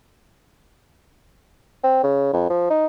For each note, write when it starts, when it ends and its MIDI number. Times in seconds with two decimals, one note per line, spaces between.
1.84 1.99 60
2.03 2.29 49
2.33 2.47 41
2.50 2.68 53
2.70 2.86 63